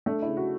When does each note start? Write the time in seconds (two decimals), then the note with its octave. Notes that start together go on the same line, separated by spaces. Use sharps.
0.06 A3 D4
0.22 C#3 E4
0.37 F#4